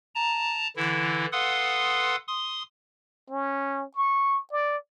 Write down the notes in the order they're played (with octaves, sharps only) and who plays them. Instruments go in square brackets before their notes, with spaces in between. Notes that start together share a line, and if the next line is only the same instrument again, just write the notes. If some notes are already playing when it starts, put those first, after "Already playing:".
[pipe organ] A5 A#5
D3 E3 E4
A4 B4 F5 F#5 C6 D#6
C6 D#6
[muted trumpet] C#4
C#6
D5